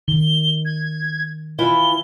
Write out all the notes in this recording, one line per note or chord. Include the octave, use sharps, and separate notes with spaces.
D#3 G7
G#6
E3 E4 F4 G7